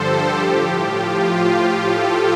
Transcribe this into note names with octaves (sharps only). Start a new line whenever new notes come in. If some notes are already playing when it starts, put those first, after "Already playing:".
Already playing: G2 D3 F3 G4 A4 C5
A2 F3
F4
A4